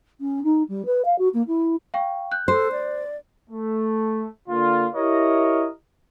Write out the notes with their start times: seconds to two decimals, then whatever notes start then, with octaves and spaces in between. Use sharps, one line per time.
0.20 C#4
0.44 D#4
0.68 G3
0.85 B4
1.05 F5
1.18 F#4
1.34 A#3
1.47 E4
1.94 F5 G5 C#6
2.32 F#6 G6
2.48 A4 C5
2.72 D5
3.50 A3
4.49 D3 A#3 F4
4.95 E4 G4 A#4 C#5 D#5